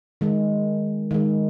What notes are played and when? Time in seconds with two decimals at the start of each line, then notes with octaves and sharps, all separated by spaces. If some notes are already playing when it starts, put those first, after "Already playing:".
0.21 D#3 G#3
1.11 D#3 G#3